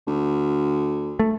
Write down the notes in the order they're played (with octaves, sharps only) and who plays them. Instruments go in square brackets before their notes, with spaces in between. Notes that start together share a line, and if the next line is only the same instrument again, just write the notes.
[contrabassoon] D2
[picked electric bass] A3